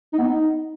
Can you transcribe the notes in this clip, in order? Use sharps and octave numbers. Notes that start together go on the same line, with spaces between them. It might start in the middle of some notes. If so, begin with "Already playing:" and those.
D#4
B3
D#4